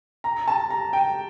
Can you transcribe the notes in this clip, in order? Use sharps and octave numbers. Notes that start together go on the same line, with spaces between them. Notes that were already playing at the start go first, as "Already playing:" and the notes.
A#5
A5
A#5
G5